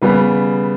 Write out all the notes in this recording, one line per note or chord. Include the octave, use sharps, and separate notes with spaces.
C#3 G3 B3 B4